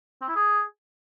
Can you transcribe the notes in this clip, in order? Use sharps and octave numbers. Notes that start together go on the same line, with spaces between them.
C4
E4
G#4